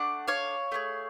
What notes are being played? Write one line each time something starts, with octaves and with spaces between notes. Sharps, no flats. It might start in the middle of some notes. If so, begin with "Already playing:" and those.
Already playing: A3 D4 D5 F#5
C#5 F5
A3 D4 G#4